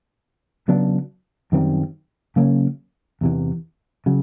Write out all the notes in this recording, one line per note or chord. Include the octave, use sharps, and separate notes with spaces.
C#3 F#3 B3 D4
F#2 D#3 G3 C4
C#3 F#3 A#3 C#4
E2 C3 E3
C#3 F#3